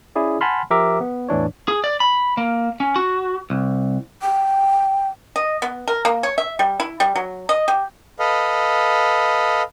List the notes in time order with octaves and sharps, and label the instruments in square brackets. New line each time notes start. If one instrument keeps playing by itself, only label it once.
[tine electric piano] C#4 E4 G#4 D5
F#5 G#5 A5 B5 C6 F6
F3 G4 A#4 E5 A#5 D6
B3
E2 A2 E3 D4 C#5
[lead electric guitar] G#4
D5
B5
A#3
C#4
F#4
C2
[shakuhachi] G5
[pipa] D#5
B3
A#4
A#3
C#5
E5
G3
E4
G3
F#3
D#5
G4
[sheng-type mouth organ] A4 B4 D#5 F5